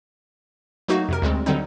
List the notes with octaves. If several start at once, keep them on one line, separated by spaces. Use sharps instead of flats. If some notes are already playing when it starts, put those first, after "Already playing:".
F#3 A3 A#3 D#4 F#4
F2 C3 A#4
D2 G3 G#3 C4
D3 F#3 G3 C4 D#4